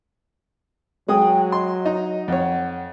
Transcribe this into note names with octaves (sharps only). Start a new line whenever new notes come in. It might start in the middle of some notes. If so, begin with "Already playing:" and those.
F#3 G#3 G5 D#6
D#5 C6
D#4
F2 C#5 F#5